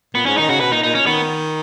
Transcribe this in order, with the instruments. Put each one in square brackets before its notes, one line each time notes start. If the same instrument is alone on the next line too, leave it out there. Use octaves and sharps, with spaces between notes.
[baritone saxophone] A#2 [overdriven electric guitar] B3
[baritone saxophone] G#2 [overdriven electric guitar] C#4
[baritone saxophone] D#3 [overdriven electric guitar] D#4
[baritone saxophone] C#3 [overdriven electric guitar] F#4
[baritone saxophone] B2 [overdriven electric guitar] B4
[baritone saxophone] A#2 [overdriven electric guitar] D#4
[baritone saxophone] A#2 [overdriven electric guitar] D#4
[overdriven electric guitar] C#4
[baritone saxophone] D#3 [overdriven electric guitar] B3